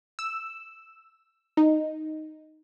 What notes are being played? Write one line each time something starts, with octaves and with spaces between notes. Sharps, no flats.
E6
D#4